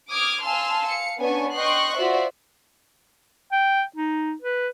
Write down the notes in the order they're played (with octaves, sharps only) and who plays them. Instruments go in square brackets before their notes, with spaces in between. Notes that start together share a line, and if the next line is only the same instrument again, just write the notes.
[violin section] D6 D#6 F6 G#6
F5 G#5 A5 C6 E6 F6
F5 C#7
B3 C#4 D4 G#5 C#6
D#5 G5 C6 C#6 F#6
F4 F#4 C5 D5 E5
[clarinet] G5
D#4
B4